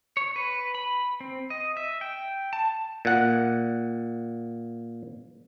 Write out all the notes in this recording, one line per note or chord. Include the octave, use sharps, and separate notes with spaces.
C#5
B4
B5
C4
D#5
E5
G5
A5
A#2 F#5